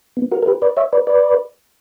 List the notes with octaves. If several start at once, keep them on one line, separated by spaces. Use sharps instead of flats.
B3
F#4 A#4
A#4
G4 B4
B4 D5
C#5 E5
B4 D5
B4 D5